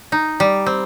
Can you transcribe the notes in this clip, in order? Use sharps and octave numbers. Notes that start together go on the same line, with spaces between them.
D#4
G3
C4